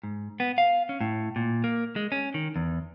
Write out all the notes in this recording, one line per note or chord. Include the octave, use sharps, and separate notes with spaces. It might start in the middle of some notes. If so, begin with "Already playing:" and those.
G#2
B3
F5
C#4
A2
A#2
A#3
G#3
C#4
D#3
E2